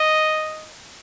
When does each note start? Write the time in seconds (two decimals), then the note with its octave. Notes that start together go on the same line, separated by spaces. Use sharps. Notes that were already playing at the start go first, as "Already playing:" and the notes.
Already playing: D#5